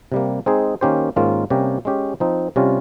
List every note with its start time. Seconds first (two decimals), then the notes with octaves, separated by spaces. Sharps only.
0.12 C3 G3 A#3
0.46 G#3 C4 D#4 G#4
0.81 D#3 A#3 C#4 G4 C5
1.16 G#2 D#3 A#3 C#4 F4
1.50 C3 G3 A#3 C#4 G4
1.85 G#3 C#4 G4
2.20 F3 C4 D#4
2.56 C3 G3 C#4 F4